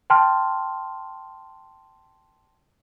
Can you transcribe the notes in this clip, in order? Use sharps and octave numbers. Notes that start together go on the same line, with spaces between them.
G5 A5 C6 F6